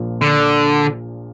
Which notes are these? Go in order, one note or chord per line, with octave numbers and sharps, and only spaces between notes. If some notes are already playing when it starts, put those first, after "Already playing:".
Already playing: A#1 A#2 F3 A#3 F4
D3